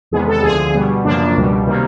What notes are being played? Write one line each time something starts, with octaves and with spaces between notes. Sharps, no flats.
E2 C3 D#3 G#3 B3 G#4
A4
D2 D3 F3 G#4
B2 G3 B3
F#2 C#3 F3 A#3 D4
C#2 B2 G3
C3 D#3 G3 A#3